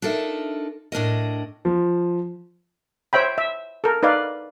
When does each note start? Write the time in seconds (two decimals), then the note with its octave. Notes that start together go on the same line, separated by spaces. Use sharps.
0.02 D4 D#4 F4 A4 A#4 E5
0.92 A2 D4 A#4 D#5
1.65 F3
3.13 C5 C#5 E5 G5 B5
3.38 E5
3.84 A4 A#4
4.03 D#4 B4 D5 F5